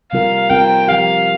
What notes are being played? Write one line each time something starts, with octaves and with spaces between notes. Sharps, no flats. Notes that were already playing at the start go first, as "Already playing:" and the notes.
C3 G3 C4 F4 A#4 F5
C3 G3 C4 F4 A#4 G5
F3 C4 G4 F5